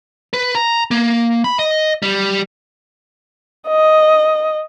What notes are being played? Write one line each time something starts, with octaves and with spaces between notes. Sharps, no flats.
B4
A#5
A#3
B5
D#5
G3
D#5